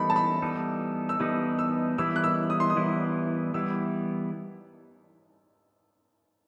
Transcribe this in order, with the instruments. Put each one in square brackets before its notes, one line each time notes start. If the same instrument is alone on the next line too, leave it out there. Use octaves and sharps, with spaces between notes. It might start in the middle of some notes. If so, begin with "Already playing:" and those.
Already playing: [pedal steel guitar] E3 G3 B3 D#4 A4 [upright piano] B5
[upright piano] A5
B5
[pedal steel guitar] E3 G3 B3 D#4 A4
[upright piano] E6
[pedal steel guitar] E3 G3 B3 D#4 A4 [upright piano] D#6
[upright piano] E6
[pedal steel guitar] E3 G3 B3 E4 [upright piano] E6
[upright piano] F#6
E6
D#6
C6
D#6
[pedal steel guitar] E3 G3 B3 E4
[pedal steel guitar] E3 G3 B3 E4 [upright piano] E6